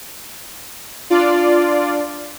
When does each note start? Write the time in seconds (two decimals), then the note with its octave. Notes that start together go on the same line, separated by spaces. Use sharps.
1.10 D4 F4 D5